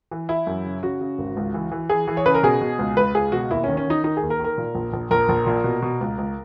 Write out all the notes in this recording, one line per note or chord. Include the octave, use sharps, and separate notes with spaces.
E3
E3 E4
F#2
C#3
C#3 F#4
C#3
G#1
C#2
E3
E3
E3 G#4
E3
C#5
C#3 B4
A#4
B2 G#4
B2
C#2
C#2 B4
C#2 G#4
B2 F#4
D#2 E4
D#3 C#4
C#4
D#3 D#4
D#3 D#4
G#4
D#2
A#4
D#3
A#4
A#2
A#1
A#1
A#1 A#4
A#1
A#2
B2
B2
C#2
C#2